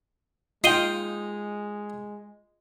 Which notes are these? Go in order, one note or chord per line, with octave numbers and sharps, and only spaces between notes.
G#3 D#4 F4 G5 C7 D#7 G7